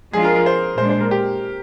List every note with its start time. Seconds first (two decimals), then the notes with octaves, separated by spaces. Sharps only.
0.13 F3 G#3 D4 F4 G#4
0.25 A#4
0.36 A#4
0.46 C5
0.78 A#2 G#3 D4 C5
0.90 C5
1.01 A#4
1.11 G4